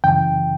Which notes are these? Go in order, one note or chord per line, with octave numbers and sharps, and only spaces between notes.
F#2 C#3 E3 G5